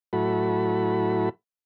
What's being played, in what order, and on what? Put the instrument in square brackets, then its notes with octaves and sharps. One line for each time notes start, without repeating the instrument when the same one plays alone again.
[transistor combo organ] A2 F#3 E4 F#4 A4 B5